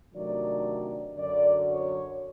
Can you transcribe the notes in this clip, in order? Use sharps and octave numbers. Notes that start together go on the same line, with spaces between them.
C3 D#3 F#3 A3 D4 D5
F#2 D3 F#3 D5
C#5